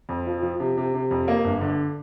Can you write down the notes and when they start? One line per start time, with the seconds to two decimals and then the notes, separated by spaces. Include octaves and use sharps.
0.09 F2
0.27 F3
0.43 F3
0.60 C3
0.78 C3
0.94 C3
1.11 F2
1.28 A#3
1.44 G1
1.61 D3